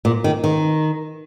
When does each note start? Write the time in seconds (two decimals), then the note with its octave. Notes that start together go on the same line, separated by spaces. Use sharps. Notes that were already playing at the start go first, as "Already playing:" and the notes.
0.05 A#2
0.24 D#3
0.44 D#3